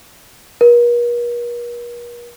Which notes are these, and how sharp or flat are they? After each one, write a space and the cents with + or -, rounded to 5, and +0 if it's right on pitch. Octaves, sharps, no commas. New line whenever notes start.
A#4 +45